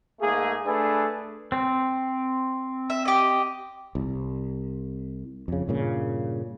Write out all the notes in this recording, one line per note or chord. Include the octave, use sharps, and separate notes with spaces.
G#2 A3 A#3 G#4
A3 D4 G#4 A4 B4
C4
E5
G4 D#5
C2
F2 C#3
G2 A#2 C#3